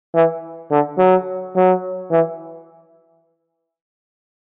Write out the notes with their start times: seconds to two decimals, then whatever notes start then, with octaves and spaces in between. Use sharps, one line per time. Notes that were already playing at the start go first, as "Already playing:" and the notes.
0.15 E3
0.71 D3
0.99 F#3
1.56 F#3
2.11 E3